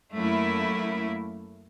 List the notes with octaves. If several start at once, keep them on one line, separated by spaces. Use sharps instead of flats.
F#2 A3 A#3 E4